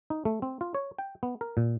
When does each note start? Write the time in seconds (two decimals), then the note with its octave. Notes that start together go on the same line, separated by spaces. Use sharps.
0.10 D#4
0.25 A3
0.42 C4
0.61 F4
0.75 C#5
0.98 G5
1.23 B3
1.41 A#4
1.57 A#2